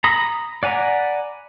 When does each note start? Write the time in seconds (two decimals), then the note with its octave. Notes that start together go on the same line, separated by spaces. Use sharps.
0.04 A#5 B5 D#6
0.63 D5 F#5 G#5 A#5 B5